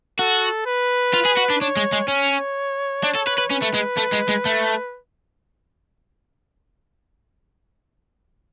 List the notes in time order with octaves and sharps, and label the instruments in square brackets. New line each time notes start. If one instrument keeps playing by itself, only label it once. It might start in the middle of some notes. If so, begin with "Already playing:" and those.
[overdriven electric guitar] F#4 [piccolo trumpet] A4
[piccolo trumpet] B4
[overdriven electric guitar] F4
G#4
F#4
D4
[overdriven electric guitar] D4 [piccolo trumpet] C#5
[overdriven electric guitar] G#3
G#3
[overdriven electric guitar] C#4 [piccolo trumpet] C#5
[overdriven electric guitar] D4
A4
B4
B4
[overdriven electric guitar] C#4 [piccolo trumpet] B4
[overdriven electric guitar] A3
G#3
A3
G#3
G#3
A3